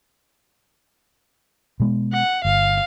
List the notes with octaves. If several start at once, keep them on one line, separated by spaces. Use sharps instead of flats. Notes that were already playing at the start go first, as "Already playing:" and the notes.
B2 G#3 B3
F#5
G1 F5